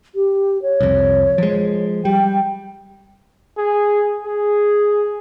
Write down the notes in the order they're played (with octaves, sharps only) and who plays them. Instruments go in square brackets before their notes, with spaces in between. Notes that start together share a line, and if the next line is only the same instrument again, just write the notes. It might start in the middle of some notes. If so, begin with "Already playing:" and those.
[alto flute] G4
C#5
[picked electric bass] C2 F2
F3 G#3
[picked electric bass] G3 [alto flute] G5
[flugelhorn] G#4
G#4